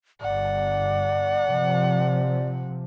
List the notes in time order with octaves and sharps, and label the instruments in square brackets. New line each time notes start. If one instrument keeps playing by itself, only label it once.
[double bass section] G1 [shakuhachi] D5 [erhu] F#5
[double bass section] C3 F3